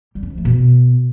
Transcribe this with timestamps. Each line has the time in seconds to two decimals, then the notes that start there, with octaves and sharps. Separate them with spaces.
0.15 G3
0.23 C#4
0.30 F3
0.38 A3
0.45 B2